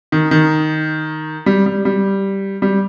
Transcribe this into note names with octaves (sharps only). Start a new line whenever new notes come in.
D#3
D#3
G3
G3
G3
G3